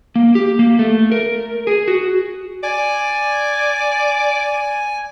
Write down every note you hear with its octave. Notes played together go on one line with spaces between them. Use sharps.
A#3
G4
A#3
A3
A#4
G#4
F#4
D5 G#5